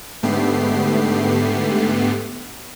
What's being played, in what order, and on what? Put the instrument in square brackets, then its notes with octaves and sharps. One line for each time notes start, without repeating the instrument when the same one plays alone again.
[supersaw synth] G#2 D3 A3 B3 G4 C7